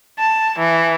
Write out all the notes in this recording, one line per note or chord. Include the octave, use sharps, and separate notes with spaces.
A5
E3